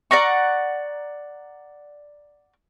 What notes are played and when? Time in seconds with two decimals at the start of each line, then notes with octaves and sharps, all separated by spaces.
0.11 D5 F#5 A#5 C#6